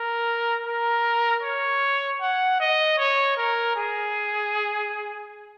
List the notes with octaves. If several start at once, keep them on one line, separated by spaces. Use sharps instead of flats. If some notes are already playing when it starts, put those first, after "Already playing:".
Already playing: A#4
A#4
C#5
F#5
D#5
C#5
A#4
G#4